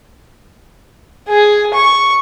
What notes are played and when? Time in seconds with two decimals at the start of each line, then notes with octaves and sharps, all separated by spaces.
1.28 G#4
1.74 C#6